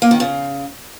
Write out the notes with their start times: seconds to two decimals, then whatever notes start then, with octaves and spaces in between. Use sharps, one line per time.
0.02 A#3
0.11 D#3
0.20 C#3